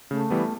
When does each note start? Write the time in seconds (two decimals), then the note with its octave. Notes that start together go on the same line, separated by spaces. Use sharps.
0.11 C#3 A3
0.30 E3 G3 B3